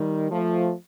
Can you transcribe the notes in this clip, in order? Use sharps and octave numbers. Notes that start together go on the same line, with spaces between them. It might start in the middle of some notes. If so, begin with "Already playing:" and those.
Already playing: D#3 G3
F3 A3